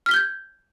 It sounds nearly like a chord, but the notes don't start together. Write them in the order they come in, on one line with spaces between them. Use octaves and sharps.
F6 B6 G7 G6 G#6